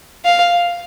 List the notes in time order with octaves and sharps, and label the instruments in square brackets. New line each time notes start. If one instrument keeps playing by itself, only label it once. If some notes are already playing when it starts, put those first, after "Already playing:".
[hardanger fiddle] F5